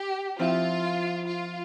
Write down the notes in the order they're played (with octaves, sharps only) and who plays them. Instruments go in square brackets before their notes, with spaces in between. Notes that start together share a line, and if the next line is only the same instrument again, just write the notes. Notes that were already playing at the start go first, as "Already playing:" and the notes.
Already playing: [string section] G4
[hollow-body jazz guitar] F3 C4 E4 [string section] F4
[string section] F4